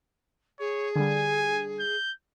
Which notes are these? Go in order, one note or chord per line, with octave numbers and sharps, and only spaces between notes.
G#4 C#5
D3 G3 G#5
G6